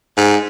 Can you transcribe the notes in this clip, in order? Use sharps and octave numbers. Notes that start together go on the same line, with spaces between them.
G#2